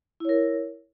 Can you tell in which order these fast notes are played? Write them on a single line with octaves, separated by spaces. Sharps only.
E4 C#5 A#4